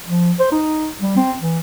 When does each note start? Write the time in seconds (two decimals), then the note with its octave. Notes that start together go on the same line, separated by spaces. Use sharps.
0.06 F3
0.39 C5
0.52 D#4
1.01 G3
1.17 C4
1.40 E3